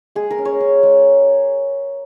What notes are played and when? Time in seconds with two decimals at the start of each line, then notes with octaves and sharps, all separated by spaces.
0.15 G#3 G#4
0.30 A#4
0.38 C#4
0.45 C#5
0.60 C#4
0.83 G#3